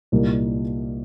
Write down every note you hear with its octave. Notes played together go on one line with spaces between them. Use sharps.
C2 A#2 G3 A#3 D#4